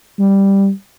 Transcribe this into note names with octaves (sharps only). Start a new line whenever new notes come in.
G3